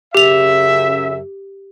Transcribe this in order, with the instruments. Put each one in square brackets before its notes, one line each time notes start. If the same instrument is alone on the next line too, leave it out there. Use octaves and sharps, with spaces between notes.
[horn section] F#2 C#3 E5 [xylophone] G4 F7